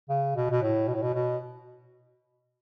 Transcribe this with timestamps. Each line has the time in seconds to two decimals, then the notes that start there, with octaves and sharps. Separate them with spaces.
0.09 C#3
0.36 B2
0.51 B2
0.62 A2
0.88 B2
0.94 A2
1.02 B2
1.14 B2